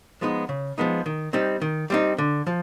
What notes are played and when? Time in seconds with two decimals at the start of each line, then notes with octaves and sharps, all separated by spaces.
0.21 F3 G#3 B3 D#4
0.49 C#3
0.78 F3 G#3 B3 D#4
1.06 D#3
1.33 G3 C4 D#4
1.62 D#3
1.90 G3 C4 D#4
2.18 D3
2.47 F3